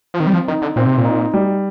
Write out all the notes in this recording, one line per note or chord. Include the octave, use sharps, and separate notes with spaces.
F3
D#3 C4
G3
F3
D#3 D#4
D3
A#2 C4
C3
A#2
D#4
G3